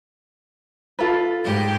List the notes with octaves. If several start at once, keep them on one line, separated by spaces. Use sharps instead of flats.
F4 A4 B4
G#2 G4